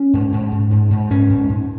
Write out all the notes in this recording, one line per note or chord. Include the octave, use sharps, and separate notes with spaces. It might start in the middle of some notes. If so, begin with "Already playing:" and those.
Already playing: C#4
G#2
G#2
G#2
G#2
G#2
G#2 C#4
G#2
G#2